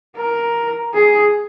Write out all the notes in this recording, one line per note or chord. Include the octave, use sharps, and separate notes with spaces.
A#4
G#4